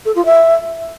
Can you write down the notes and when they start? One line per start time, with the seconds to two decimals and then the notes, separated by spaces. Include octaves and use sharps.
0.05 A4
0.15 F4
0.25 E5